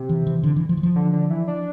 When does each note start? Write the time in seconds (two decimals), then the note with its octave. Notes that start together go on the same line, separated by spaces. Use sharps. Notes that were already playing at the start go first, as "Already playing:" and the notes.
Already playing: C3
0.09 E3
0.27 E3
0.43 D3
0.56 E3
0.69 F3
0.77 E3
0.83 F3
0.96 D3
1.13 D3
1.30 E3
1.48 D4